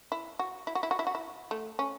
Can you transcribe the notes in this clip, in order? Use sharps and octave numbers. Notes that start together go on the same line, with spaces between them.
E4
F#4
E4
F#4
E4
F#4
E4
F#4
E4
A3
C#4